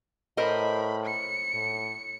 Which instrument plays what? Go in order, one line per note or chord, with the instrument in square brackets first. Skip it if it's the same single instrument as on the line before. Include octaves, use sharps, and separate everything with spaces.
[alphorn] A2 [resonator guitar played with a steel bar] A#4 C5 D#5 [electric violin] B5
[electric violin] C#7
[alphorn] A2